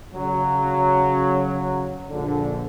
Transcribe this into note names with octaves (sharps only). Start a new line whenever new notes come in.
C#3 F#3
A#1 D3